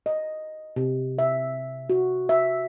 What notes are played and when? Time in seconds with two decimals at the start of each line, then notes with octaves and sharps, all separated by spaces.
0.06 D#5
0.76 C3
1.19 E5
1.90 F#4
2.29 E5